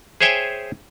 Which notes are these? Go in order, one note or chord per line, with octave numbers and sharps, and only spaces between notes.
G#4 C5 C#5 E5 G5 G#5